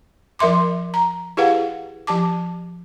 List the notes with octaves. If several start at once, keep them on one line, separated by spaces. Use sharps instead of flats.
F3 A#4 E5 C6 D6
A#5
E4 G4 G#4 B4 F5 F#5
F3 G4 A5 D6